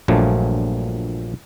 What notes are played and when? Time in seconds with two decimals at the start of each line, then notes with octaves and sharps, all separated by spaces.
0.08 A#1 G2 A#2 F3 F#3 A3